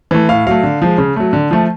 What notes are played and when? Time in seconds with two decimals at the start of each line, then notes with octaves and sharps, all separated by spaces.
0.11 E3 A3
0.29 A2 F5
0.47 F#3 A3 F5
0.63 D3
0.82 F3 G#3
0.98 C#3
1.16 F#3 A3
1.33 D3
1.51 F3 A3